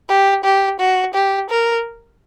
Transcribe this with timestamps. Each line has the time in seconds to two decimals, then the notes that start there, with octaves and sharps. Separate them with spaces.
0.09 G4
0.44 G4
0.80 F#4
1.14 G4
1.50 A#4